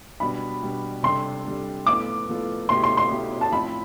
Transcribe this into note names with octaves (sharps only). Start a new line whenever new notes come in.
B2 G3 D4 B5
B2 G3 D4
C3 G3 D4 A4 C6
C3 G3 D4 A4
A2 F3 B3 F4 A4 D6
A2 F3 B3 F4 A4
B2 A3 E4 G4 C6
C6
C6
B2 A3 E4 G4
A5
A2 F3 C4 B5